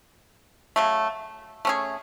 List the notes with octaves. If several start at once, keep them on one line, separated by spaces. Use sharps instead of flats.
C#3 F#3 A3
A3 C#4 G#4